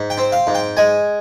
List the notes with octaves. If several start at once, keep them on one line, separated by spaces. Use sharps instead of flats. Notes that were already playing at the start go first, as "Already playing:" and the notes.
Already playing: G#2
G5
C4
F5
G#2
G5
G#3 G#5